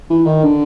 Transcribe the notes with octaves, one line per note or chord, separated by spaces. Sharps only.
E3
D#3
D3